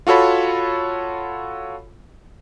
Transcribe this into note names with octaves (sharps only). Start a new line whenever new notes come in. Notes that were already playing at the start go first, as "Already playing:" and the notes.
F4 F#4 A4 C#5 B5